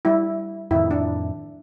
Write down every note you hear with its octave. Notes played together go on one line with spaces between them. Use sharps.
G3 E4
F2 A2 D#3 E4
D4